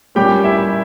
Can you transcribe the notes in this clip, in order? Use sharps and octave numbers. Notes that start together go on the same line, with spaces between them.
A#2 G3 A#3 C#4 G4 G5
E4 E5